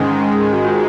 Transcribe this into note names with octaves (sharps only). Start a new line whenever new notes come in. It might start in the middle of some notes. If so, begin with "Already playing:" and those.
Already playing: G#2 D#3 G#3 C#4
F#4
F4